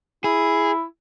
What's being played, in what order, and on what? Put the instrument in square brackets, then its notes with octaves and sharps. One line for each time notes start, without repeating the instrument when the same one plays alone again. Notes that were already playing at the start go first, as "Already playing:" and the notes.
[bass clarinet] E4 [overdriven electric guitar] G#4